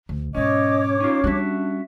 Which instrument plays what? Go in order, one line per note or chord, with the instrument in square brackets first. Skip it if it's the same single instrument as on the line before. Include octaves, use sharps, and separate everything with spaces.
[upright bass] D2
[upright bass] G#2 B2 [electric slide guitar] C#4 [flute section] C#5 D6 [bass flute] D#5
[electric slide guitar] C#4 F4 [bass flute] D#4
[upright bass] G3 C#4 [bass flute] D4 [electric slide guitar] F#4 E5